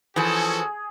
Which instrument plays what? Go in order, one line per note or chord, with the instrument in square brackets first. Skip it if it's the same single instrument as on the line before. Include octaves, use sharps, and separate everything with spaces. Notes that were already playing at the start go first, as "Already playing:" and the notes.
[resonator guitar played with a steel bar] E3 F3 [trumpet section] C#4 F#4 A4 [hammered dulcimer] G#4